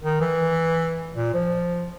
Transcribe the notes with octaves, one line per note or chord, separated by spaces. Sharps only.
D#3
E3
A#2
F3